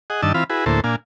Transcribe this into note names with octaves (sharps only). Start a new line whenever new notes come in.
G#4 D#5 F#5
G2 D#3 D4 D#5 A5 E6
E3 C4 F4 F5 B5
E4 F#4 G#4 B4
D2 A2 A#3 E4 A4 C5
A#2 A#3 D4 F5 G#5